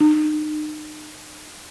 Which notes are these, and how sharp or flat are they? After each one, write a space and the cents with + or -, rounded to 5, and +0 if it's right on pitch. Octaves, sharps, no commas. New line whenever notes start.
D#4 -35